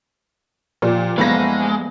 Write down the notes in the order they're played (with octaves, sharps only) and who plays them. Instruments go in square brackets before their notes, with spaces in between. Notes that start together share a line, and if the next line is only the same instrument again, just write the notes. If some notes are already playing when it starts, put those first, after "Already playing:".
[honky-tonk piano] A#2 [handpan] F3 G4 D5
[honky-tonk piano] F#1 B5 A#6 [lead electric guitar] G#3 [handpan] A3 B3 F5